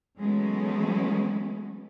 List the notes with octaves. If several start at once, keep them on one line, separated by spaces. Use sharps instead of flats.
E3 F#3 G#3 A3 B3 C#4